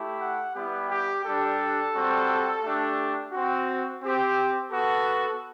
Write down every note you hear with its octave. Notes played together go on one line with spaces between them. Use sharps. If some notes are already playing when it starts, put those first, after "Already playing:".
Already playing: A3 E4 G4
F#5
G3 B3 E4 G4
G4
G3 D4 G4 A4
G3 C4 F#4
A3 D4 G4
C4 F#4
C4 G4
B3 F#4 A4